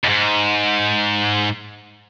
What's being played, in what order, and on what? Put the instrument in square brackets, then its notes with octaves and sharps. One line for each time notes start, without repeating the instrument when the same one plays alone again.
[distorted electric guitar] F2 G#2